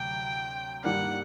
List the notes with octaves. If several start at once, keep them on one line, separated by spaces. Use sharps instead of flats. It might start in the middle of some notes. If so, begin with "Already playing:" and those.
Already playing: D2 C3 F#3 G5
G2 D#3 G3 A#3 D4 F#5